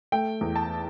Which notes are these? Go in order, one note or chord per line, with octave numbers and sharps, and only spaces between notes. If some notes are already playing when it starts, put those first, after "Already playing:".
A3 G5
E2
A5